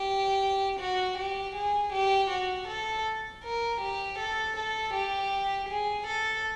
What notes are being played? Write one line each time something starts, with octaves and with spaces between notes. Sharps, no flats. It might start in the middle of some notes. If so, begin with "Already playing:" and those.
Already playing: G4
F#4
G4
G#4
G4
F#4
A4
A#4
G4
A4
A4
G4
G#4
A4